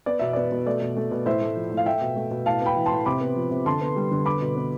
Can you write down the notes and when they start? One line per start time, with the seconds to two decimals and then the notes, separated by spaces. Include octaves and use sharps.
0.06 B3 D5
0.19 B2 E5
0.33 B3 D5
0.52 B2
0.66 A3 D5
0.82 B2
0.96 A3
1.11 B2
1.26 A2 C5 E5
1.41 A3
1.56 F3
1.71 A2
1.77 F5
1.86 A3 E5 G5
2.01 B2
2.16 A3
2.31 B2
2.46 A2 F5 A5
2.62 B3 G5 B5
2.76 E3
2.86 A5 C6
2.91 A2
3.06 C3 B5 D6
3.21 B3
3.36 F3
3.51 C3
3.66 D3 A5 C6
3.81 B3
3.96 G3
4.11 D3
4.26 B3 B5 D6
4.41 B2
4.56 B3